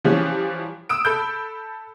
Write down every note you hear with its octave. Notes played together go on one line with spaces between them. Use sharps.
E3 F3 G3 C#4
D#6 E6 D7
A4 B5 G6